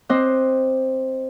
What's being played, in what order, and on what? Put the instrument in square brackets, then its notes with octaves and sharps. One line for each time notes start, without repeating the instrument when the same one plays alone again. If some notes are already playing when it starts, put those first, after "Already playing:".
[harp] C4 C5 D#5 D6 F#6